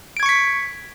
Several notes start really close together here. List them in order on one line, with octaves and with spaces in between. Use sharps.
D7 G#6 C#6 C#7 B6